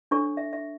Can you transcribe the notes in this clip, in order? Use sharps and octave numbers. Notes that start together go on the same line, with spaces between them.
D4 A4 C#5 C#6
E5
E5